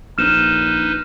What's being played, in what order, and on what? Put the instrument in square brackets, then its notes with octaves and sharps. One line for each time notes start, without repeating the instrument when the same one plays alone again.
[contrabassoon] A#1 [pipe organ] D#4 B4 [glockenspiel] F6 E7